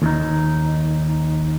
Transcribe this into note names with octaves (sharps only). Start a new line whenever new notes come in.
D#2 D#4